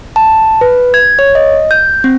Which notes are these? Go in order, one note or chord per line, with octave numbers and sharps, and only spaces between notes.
A5
B4
G#6
C#5
D#5
G6
C4